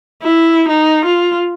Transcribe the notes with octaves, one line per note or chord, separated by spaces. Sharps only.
E4
D#4
F4